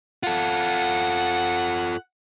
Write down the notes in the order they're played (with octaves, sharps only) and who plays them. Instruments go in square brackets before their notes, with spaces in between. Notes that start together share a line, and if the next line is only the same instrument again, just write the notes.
[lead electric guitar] F4 A4 [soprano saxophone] F#5